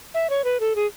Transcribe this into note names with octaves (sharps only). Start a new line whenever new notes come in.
E5
C#5
B4
A4
G#4